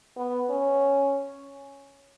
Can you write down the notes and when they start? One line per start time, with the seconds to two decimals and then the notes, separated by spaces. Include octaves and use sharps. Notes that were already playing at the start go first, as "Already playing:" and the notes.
0.17 B3
0.50 C#4